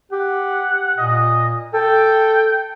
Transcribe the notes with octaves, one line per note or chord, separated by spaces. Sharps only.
G4 F#5
A#2 D#5
A4 G5